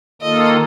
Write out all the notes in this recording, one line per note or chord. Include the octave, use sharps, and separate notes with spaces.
D#3 A#3 F4 A4 D#5